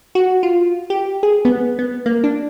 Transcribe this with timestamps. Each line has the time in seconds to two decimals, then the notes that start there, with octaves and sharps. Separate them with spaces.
0.15 F#4
0.43 F4
0.90 G4
1.23 G#4
1.45 B3
1.79 B3
2.06 A#3
2.24 D4